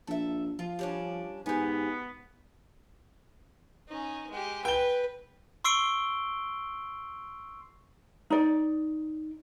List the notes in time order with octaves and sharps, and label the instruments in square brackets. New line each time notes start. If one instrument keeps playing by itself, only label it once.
[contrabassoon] A#1 [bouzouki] A4 E5
[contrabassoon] F3 [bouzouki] F4
[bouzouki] G3 C#4 D4
[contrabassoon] G#2 [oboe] B3 [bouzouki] G4 G#5
[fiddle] C#4 D#4
G#3 G4
[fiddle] B4 [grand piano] G5 G7
[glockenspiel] C6 C#6 E6 C7 D7 G7
[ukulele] D#4 D5